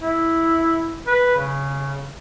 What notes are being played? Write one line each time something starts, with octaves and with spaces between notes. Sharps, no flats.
E4
B4
C#3